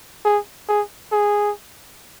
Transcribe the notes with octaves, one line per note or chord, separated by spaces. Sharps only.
G#4
G#4
G#4